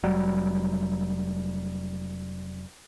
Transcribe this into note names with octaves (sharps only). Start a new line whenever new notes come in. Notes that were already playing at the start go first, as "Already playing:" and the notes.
F1 F#3 G3